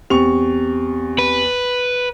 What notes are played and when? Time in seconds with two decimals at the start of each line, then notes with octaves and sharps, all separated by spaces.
0.10 E2 C4 G4 C#6 F7
1.19 B4